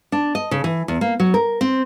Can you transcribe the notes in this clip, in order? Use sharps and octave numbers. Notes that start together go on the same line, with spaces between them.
D4
D#5
C#3
E3
E2
A#3
F#3
A#4
C4